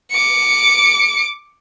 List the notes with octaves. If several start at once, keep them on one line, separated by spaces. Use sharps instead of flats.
D6 C#7